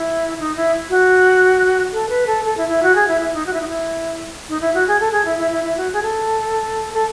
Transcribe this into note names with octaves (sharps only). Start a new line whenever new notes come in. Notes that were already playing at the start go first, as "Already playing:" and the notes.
Already playing: E4
D#4
E4
F#4
A4
B4
A4
A4
E4
E4
F#4
G#4
E4
E4
D#4
F#4
E4
D#4
E4
D#4
E4
F#4
G#4
A4
G#4
E4
E4
E4
E4
F#4
G#4
A4
A4